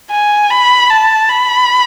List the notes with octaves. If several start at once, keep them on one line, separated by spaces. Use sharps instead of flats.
G#5
B5
A5
B5